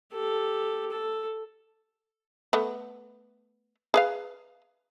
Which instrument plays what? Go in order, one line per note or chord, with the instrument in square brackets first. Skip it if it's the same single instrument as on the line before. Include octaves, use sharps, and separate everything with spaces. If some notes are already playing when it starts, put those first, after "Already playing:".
[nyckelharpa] G4 A4
A4
[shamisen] A3 B3
G#4 B4 F5